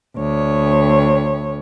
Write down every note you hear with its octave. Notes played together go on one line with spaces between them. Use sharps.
D2 C#5